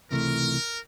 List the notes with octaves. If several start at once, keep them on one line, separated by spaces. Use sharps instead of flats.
C#2 C3 E3 A3 A#4